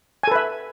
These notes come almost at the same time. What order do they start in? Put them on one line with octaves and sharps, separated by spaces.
G#5 A4 B4 E5